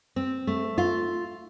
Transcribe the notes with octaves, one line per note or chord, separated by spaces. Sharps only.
C4
A3
F4